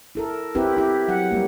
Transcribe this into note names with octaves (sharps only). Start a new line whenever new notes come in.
E4 A4 A#4
C4 E4 G4 A#4 B4
E4 G4
F#3 F#5
G3 A#3